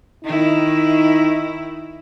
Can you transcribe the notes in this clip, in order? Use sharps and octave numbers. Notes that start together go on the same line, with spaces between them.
D#3 D#4 E4